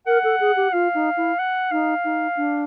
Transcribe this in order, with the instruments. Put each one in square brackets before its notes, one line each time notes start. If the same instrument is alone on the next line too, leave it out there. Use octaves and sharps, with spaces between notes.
[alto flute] A#4 [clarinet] F#5
[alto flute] A4
G#4
G4
[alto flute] F4 [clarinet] F5
[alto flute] D#4
E4
[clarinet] F#5
[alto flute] D#4 [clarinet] F5
[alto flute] D#4
D4